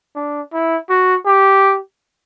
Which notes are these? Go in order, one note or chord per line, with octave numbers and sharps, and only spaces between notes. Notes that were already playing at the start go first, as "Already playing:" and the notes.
D4
E4
F#4
G4